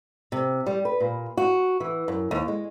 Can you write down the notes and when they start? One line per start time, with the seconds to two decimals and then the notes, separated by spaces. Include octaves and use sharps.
0.32 C3
0.66 G3
0.85 B4
1.00 A#2
1.37 F#4
1.80 E3
2.08 F#2
2.31 D#2
2.48 G#3